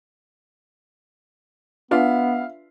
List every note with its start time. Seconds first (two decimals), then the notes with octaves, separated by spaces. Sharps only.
1.91 B3 D4 F4 B4 E5 F5